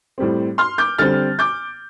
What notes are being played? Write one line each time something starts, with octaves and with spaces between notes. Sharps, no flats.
A2 G3 C4
C6 F6
D6 G6
D3 G3 C4 F6 A6
D6 G6